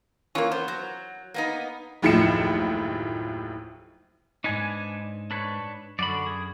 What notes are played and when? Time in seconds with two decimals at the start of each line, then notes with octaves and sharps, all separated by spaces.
0.35 E3 A#3 C#4 F4
0.52 B3 C5
0.68 F#3
1.34 A#3 B3 D#4
2.02 F#1 D#2 A2 F3 C#7 E7
4.44 G#2 D4 D#4 B4 G#5
5.31 D4 B4 C#5
5.99 F#2 D3 F#4 D5 B5
6.26 G#4